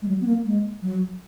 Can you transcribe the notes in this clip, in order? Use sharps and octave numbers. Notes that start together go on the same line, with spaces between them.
G#3
F#3
B3
A#3
G#3
F#3